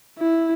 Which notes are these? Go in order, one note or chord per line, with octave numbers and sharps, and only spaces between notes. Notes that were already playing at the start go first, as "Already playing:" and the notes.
E4